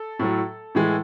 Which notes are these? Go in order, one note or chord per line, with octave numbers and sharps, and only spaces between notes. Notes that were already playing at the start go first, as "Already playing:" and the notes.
Already playing: A4
A2 F#3
A2 E3 G#3